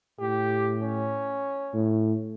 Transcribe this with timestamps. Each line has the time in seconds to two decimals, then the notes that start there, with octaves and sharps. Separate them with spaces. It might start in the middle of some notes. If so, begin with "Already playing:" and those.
0.20 A2 G4
0.82 C#4
1.74 A2